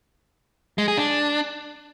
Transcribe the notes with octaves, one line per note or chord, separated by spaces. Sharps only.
G#3
G#4
D4